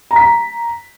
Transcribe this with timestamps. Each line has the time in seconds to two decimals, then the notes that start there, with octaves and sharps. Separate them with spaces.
0.11 A#5
0.16 B6
0.21 A#5